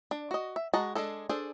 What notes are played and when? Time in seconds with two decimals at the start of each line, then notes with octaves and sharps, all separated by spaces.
0.11 D4
0.31 F#4 D#5
0.56 E5
0.74 G#3 F#4 D#5 A5 A#5
0.95 G#3 D4 G#4 A4
1.29 D4 G#4 A4 C5